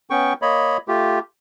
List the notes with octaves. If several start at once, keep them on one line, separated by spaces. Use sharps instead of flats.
B3 C#4 G5 C#6
A#3 C#5 D#5 B5
A3 F4 G4